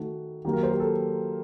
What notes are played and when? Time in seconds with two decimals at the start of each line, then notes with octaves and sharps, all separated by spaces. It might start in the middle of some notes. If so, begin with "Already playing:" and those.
Already playing: D#3 A3 D#4 F#4
0.45 D#3 F#3 A#3 G4
0.53 A#4
0.63 C5
0.71 G4
0.80 A4